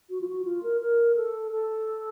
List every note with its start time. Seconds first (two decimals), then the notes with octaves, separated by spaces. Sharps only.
0.10 F#4
0.21 F4
0.27 F#4
0.45 F4
0.63 A#4
0.81 A#4
1.16 A4
1.51 A4